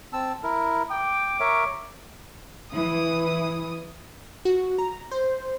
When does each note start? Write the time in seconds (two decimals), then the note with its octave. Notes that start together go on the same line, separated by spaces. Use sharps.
0.13 C4 A5 E6
0.43 E4 A#4
0.90 G5 D6
1.40 A#4 C#5 E5
2.72 E3 D#6
4.45 F#4
4.78 A#5
5.11 C5